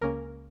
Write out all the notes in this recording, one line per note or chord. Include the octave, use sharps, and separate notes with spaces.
C#2 C#3 A#3 C#4 A#4